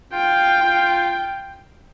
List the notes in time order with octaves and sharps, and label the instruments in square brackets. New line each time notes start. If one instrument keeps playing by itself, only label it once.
[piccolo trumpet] F4 [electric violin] G5
[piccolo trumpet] F4